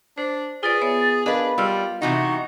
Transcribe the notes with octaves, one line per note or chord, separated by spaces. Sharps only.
D4 C5
F4 G#4 B4 D5 A6
B3 C#5 E5
D4 G#4 A#4 B4 D#5 F5 B5
G3 F4 E6 F6
C3 E3 D#4 F#4 C#6